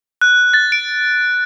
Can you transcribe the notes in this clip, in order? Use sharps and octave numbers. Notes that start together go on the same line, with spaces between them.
F#6
A6
D7